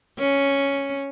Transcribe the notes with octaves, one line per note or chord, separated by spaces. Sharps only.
C#4